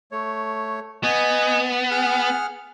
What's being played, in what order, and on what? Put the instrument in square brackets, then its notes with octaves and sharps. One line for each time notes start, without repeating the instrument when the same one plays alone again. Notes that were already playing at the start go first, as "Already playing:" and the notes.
[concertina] A3 C#5
[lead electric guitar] B3 [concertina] D#5 G#5
[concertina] G#4 F#5 F6